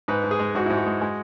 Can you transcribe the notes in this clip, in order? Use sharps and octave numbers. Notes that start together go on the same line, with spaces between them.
G#2 B4
G#2
G#4
G#3
G#2 F#4
G#2 E4
F#4
G#3
G#3